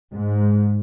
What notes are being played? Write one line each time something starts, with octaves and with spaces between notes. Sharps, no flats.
G#2